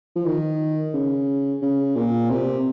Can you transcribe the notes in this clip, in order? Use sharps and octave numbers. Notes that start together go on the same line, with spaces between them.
F3
D#3
C#3
C#3
A#2
C3